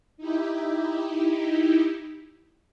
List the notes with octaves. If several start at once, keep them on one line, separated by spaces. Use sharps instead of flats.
D#4 E4 G4